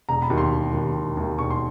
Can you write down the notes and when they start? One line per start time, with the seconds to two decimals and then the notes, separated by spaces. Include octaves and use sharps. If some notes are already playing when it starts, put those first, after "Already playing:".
0.09 E1 A#5
0.22 B5
0.30 D#2 D#3
0.38 C6
0.51 E1
0.73 D#2 D#3
0.95 E1
1.17 D#2 D#3
1.39 E1 C#6
1.50 C6